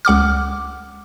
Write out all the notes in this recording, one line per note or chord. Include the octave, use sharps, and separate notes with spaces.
C#2 F#5 D6 F6